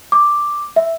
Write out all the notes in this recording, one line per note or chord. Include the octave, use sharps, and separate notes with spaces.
D6
E5